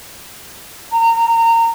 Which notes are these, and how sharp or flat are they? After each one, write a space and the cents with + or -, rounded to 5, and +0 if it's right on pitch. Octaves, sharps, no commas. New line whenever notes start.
A#5 -25